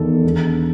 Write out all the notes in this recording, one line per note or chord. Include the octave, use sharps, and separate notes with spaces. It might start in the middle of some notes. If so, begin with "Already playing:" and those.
Already playing: E2 D#3 A4
E1